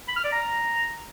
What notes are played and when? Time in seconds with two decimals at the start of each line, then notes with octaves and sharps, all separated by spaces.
0.08 B5
0.16 F6
0.24 D5
0.32 A#5